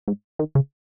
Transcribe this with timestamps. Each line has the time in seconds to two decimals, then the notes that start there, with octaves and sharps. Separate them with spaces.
0.08 G#2
0.39 D#3
0.55 C#3